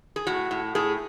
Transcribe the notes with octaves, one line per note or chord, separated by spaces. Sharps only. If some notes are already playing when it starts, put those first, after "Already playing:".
G#4
A2 F#4
A2
A2 G#4